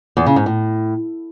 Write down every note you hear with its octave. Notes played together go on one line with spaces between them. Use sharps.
E2
C#3
G#2
A2